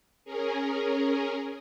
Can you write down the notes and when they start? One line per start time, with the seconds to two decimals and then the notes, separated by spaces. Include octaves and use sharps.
0.25 C#4 G#4 A#4